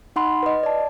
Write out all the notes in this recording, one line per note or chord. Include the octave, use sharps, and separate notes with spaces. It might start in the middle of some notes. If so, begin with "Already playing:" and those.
D#4 F#5 B5 C6
B4 D#5
D5 A5